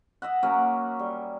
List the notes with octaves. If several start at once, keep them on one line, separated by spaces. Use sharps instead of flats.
D#5 E5 F#5
F#3 A#3 C#4
G3